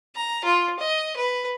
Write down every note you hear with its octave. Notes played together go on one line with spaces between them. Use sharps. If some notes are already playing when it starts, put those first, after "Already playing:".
A#5
F4
D#5
B4